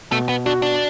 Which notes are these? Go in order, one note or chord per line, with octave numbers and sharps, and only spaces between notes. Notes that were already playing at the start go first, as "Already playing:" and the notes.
B2 A3
B3
D4 F#4
D4